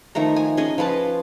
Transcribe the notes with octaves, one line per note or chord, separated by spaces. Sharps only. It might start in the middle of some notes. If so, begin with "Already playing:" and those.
D#3 F3 A3 A#5
G#5
C#4 G#4 D#5 G#5
F3 F4 B4 A5